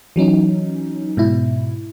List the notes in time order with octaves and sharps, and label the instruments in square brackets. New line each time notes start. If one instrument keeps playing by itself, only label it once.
[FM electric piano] E3 F#3 C#4 D#4
G#2 B2 E4